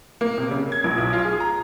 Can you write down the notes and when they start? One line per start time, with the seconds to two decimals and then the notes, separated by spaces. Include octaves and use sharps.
0.21 A#3
0.38 C3
0.51 C#3
0.72 G#6
0.84 A#1
0.98 B1
1.13 F4
1.25 G#4
1.40 A#5